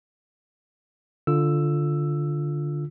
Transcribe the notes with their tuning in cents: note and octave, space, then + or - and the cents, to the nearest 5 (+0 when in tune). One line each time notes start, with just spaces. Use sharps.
D3 +0 F4 +0 E6 +5